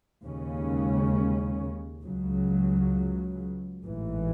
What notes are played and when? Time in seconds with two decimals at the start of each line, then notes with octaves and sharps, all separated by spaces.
0.24 D#2 C#3 G#3 C#4
2.03 C#2 C#3 F#3
3.84 A1 G#2 E3